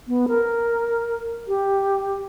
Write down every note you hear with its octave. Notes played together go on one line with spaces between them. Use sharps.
B3
A#4
G4